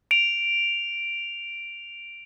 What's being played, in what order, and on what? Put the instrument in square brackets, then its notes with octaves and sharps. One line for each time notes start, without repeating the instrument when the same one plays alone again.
[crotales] D7 F7